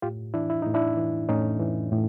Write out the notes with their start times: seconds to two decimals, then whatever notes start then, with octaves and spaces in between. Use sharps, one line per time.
0.02 A2 F4 G4
0.34 E3 D4 E4
0.50 E4
0.62 A2 D#4
0.74 D4 E4
0.97 E3
1.29 A2 C#4 D#4
1.60 E3
1.92 A2